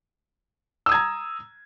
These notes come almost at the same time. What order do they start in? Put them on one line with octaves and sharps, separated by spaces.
E6 D#6 G#6 A#5